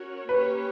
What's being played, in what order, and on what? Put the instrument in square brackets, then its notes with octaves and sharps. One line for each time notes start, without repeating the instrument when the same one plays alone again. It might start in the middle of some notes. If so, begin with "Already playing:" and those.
Already playing: [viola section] C#4 F#4 A#4 C#5
[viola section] A#3 C#4 G4 C#5 [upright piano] B4